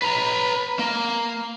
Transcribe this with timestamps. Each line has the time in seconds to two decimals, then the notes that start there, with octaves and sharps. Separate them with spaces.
0.02 B4 A#5
0.79 A#3